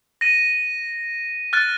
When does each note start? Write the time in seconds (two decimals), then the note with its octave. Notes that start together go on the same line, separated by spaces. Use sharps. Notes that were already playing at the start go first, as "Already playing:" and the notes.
0.21 A#6 D#7
1.53 F6 F#6 A6